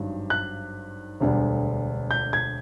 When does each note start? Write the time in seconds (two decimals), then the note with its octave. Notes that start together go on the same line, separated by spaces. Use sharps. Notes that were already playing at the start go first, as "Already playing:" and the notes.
Already playing: G#1 G2 D#3 F#3
0.30 F#6
1.20 E1 D2 D3 G3
2.11 G6
2.33 G#6